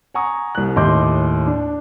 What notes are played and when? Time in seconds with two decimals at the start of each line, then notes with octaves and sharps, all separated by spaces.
0.14 F#5 G#5 A#5 C#6 D#6
0.55 C2 F#6
0.76 D#2 A2 D#5 C6 D6 G6
1.47 D4